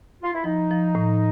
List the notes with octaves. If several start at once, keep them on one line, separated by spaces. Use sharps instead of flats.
F4
E4
F3 D#4
F3
A2